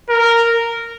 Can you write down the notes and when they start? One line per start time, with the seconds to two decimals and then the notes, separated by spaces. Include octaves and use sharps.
0.09 A#4